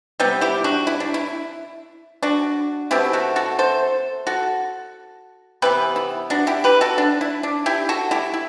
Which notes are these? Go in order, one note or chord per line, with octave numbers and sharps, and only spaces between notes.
C3 G3 B3
E4 G4
D4 F#4
E4
D4
E4
D4 F#4
B2 A3 C4 E4 G4
F#4 A4
F#4 A4
A4 C5
F#4 A4
C3 E3 B3 G4 B4
E4
D4 F#4
E4 G4
G4 B4
F#4 A4
D4
E4
D4
E4 G4
F#4 A4
E4 G4
E4